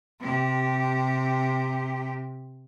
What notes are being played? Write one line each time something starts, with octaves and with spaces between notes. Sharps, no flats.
C3 G4